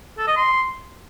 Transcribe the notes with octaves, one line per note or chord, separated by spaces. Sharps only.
A4
D#5
C6